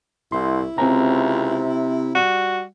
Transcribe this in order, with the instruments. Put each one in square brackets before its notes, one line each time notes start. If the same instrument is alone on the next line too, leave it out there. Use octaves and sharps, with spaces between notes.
[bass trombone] C2 [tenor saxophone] E4 [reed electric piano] C6
[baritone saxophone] C#2 [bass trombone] C3 [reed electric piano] C4 A#5
[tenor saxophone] G3 [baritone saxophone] F#4